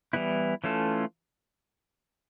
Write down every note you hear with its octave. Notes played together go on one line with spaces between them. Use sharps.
E3 G3 B3 E4
E3 A3 C#4 F4 A4